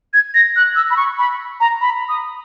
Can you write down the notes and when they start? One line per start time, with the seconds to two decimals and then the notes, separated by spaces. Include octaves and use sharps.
0.14 G#6
0.34 A#6
0.56 F#6
0.76 E6
0.91 B5
0.97 C#6
1.19 B5
1.60 A#5
1.81 B5
2.09 D#6